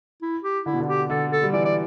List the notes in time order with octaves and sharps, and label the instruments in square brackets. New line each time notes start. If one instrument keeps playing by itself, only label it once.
[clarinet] E4
G4
[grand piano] D3 [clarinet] E4
[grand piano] B2
D3
[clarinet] G4
[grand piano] D3 [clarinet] A4
[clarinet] A4
[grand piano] G3
[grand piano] E3 [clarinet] D5
[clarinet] D5